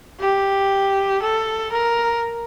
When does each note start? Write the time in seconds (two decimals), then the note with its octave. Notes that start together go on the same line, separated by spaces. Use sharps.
0.20 G4
1.22 A4
1.72 A#4